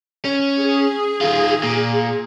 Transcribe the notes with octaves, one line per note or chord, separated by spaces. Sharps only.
C#4
G#4
D#3 F4
A#2